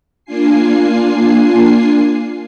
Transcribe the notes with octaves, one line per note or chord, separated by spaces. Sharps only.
A#3 D4 F4 G#5 C7